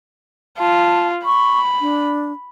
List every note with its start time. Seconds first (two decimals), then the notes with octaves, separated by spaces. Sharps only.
0.59 F4 A5
1.25 B5 C#6
1.81 D4